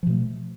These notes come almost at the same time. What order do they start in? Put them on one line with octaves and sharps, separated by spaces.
F3 B2 A3